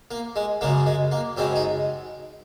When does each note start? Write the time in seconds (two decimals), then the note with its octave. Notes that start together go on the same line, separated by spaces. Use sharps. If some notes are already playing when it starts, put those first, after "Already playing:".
0.11 A#3
0.36 G#3
0.61 F#2 C#3 G#3 A#3
0.86 G#3
1.11 A#3
1.37 F#2 C#3 G#3 C4
1.56 D#4